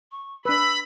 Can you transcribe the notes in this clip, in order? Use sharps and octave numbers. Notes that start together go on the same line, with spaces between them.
C#6
D4 B4 B5 E6